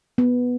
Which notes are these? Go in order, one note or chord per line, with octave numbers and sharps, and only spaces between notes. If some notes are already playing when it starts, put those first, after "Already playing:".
B3